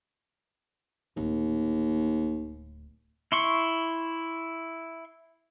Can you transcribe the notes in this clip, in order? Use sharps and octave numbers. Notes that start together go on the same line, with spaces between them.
D1 D#2
E4 C6 C#6